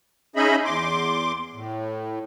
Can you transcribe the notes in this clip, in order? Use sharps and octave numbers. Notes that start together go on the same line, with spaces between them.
C#4 D#4 G#4 D#5 E5 B5
E2 C6 D6
A2